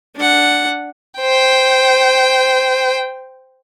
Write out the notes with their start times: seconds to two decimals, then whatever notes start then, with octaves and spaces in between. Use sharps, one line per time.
0.16 D4 F#5
1.20 C5 G5